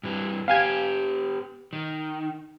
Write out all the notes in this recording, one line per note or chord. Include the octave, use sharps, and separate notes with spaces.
G2 E3
B3 G4 F5 G#5 G#6
D#3